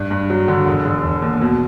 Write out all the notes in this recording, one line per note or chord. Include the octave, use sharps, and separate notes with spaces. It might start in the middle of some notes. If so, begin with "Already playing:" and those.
Already playing: G2
G2
F#3
D3
E1
E1
E1
D#2
B2